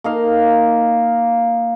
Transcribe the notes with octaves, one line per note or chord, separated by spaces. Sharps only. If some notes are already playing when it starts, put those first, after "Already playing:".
A#3 D#4 F5